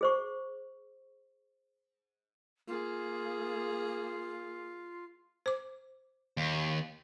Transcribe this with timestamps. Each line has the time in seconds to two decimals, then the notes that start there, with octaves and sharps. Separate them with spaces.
0.01 G#4 C5 C#6
2.68 A#3 F4 G#4
5.46 C5 D6
6.37 D#2